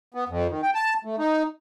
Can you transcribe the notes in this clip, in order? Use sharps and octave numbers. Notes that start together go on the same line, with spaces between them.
B3
F2
D#3
G5
A5
A3
D#4